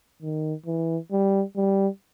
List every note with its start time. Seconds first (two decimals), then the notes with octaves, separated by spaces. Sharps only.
0.22 D#3
0.66 E3
1.12 G3
1.56 G3